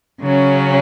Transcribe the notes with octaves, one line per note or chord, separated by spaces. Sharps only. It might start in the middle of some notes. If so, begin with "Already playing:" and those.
C#3 F#3 C#4